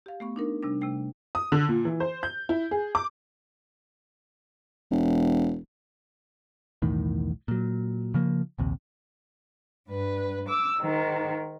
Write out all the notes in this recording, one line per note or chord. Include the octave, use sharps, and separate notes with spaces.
G4 F5
A3 B3 C#6
D4 D#4 A#4
C3 G3 D4
C3 A3 G5
D#6
D3
A#2
E3
C5
G6
E4
G#4
D6
E1
B1 E2 A2 D#3
A#2 F#3
C#3 F3 A#3
A#1 D#2 C3
G2 B4
D6 E6
G#2 D#3